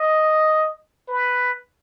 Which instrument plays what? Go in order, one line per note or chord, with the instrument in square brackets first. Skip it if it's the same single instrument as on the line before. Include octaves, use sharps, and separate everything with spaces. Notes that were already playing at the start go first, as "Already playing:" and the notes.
Already playing: [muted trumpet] D#5
B4